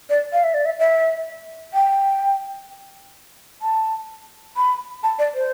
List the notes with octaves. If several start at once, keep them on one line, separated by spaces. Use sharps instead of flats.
D5
F5
E5
D5
E5
E5
G5
A5
B5
A5
D5
C5